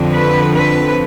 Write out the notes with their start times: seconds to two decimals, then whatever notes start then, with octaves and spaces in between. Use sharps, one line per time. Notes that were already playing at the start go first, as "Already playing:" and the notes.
Already playing: F2 D3 F3 C4
0.13 B4
0.53 B4